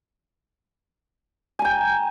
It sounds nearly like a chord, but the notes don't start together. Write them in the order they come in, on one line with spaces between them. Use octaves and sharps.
G#5 A#5 G5